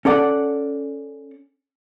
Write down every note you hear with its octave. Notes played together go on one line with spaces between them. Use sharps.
C#4 A4 D5 F#5